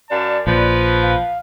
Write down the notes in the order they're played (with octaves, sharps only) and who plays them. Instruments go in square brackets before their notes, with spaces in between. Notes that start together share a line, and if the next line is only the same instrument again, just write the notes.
[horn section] F#2 F5 A5 [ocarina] D5
[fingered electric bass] A#1 [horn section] F3 B4
[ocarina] F5